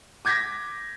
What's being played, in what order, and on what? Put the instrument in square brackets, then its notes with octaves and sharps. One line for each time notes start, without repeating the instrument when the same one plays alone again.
[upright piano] D6 G6 G#6 A#6 B6